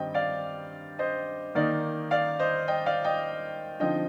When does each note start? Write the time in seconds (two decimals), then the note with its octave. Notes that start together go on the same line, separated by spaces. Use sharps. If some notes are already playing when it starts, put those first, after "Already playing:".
Already playing: G2 D#3 G3 C4 D#5 G5
0.14 D5 F5
0.99 C5 D#5
1.55 D#3 A#3 D#4 D5
2.11 D5 F5
2.39 C5 D#5
2.68 D#5 G5
2.86 D5 F5
3.04 D#5 G5
3.80 D3 F3 C4 D#4 D#5 G5